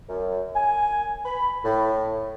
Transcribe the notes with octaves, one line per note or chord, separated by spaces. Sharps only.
F#2
G#5
B5
A2